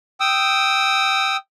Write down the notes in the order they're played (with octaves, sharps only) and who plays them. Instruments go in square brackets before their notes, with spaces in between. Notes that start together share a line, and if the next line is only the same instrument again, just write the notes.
[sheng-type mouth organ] G5 D#6 E6